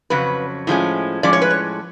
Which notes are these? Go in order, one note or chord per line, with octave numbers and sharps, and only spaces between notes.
F2 C#3 F#3 C#4 B4
A2 F3 G#3 C#4
A2 F3 G#3 C#4 D5
C#5
B4
C#5